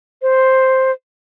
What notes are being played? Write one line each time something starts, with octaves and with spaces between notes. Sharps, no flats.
C5